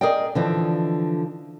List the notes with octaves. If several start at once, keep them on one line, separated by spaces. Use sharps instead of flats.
G#4 A#4 D5 D#5 G5
D3 E3 F3